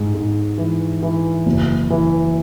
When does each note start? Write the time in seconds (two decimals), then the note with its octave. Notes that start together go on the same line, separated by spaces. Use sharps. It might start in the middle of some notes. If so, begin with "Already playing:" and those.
Already playing: G#2
0.14 G#2
0.58 E3
1.03 E3
1.46 F#1
1.90 E3